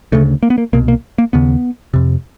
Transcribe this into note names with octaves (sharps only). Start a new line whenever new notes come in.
D2 C#3 A3
A#3
B3
A#3
C2 B2 A#3
A#3
A#3
D#2 C#3 B3
F2 C3